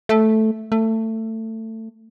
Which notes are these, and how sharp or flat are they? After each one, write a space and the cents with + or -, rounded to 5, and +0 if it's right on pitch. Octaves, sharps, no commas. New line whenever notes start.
A3 -5
A3 +20